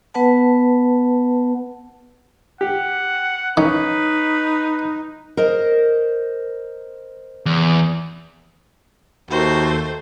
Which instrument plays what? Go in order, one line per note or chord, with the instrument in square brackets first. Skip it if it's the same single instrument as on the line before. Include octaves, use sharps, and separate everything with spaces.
[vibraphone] B3 B4 F#5 A5
[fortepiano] G4 [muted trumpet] F#5
[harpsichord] D#3 [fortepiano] C#4 [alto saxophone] D#4 [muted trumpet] B4
[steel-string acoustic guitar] A#4 C5 D#5
[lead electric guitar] E2
[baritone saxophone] D#2 [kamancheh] A3 C5 [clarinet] F#4